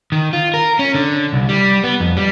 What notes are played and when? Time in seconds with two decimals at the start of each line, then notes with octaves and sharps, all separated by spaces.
0.12 D#3
0.33 F4
0.54 A#4
0.79 C#4
0.95 D3
1.33 C2
1.49 G3
1.84 B3
2.00 F2
2.17 G3